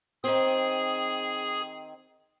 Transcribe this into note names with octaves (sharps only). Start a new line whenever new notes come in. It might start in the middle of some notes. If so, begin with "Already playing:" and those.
D#3 C4 G#4